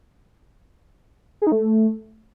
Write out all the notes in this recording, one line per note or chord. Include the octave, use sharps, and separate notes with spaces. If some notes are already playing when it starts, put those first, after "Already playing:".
G#4
D#4
A3